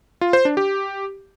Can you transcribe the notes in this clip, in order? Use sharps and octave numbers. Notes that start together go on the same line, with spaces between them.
F4
C5
D4
G4